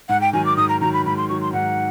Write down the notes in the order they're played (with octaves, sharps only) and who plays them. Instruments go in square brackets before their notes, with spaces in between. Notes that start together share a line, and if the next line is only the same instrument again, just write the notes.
[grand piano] G#2 [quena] F#5
[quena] G5
[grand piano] D#3 F#3 [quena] G#5
[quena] D6
[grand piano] G#2 [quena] D#6
[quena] A#5
[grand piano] D#3 F#3 [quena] A#5
[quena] B5
[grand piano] G#2 [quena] B5
[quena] C6
[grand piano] D#3 F#3 [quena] C#6
[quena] C6
[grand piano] G#2 [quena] F#5